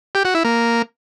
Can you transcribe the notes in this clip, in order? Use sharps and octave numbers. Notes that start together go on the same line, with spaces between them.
G4
F#4
E4
A#3